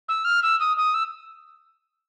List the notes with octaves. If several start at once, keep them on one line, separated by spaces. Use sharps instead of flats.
E6
F6
E6
D#6
D#6
E6